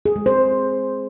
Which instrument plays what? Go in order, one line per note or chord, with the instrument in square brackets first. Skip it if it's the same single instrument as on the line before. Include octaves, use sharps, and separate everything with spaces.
[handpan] G#4
G#3
C5